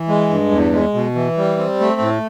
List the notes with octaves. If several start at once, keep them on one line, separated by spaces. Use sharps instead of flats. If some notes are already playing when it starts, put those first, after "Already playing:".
Already playing: E3
G#3
G2
E2
G#3
B2
E3
G3
C4
A3
A2